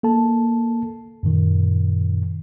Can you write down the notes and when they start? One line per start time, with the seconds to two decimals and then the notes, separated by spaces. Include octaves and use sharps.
0.03 A#3 A4 A5
1.23 F#2 A#2 D#3